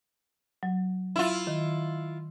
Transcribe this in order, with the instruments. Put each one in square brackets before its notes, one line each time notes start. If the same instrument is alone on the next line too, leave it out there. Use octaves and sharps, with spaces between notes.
[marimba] F#3
[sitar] E4 F4
[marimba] D#3